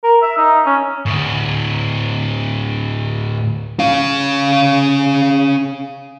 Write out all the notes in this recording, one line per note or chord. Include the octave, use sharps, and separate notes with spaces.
A#4
E5
D#4
C#4
D2 A2
C#4 F5